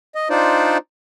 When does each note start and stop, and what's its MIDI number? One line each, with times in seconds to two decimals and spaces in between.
0.15 0.28 75
0.30 0.78 62
0.30 0.78 63
0.30 0.78 65
0.30 0.78 72
0.30 0.78 74